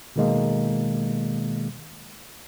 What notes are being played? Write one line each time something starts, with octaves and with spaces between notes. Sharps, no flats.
B2 D#3 G#3 A#3